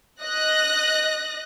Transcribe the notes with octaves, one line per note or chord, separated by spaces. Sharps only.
D#5 F#6 A#6